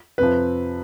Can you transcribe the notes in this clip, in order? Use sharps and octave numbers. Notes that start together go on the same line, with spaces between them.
F2 C3 F3 B4